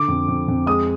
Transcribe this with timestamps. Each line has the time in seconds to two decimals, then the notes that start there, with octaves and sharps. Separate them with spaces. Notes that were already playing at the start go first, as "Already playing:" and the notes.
Already playing: D3 D6
0.08 F2
0.28 F2
0.48 F2
0.67 G#3 D#6